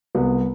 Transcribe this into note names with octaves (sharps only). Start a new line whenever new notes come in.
C2 B3